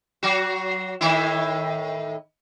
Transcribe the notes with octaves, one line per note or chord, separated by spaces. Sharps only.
F#3 F#4
A2 D#3 E4